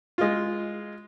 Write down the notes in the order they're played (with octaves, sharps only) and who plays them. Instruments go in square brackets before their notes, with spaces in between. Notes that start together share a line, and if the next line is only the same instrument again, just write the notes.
[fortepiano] G#3 F4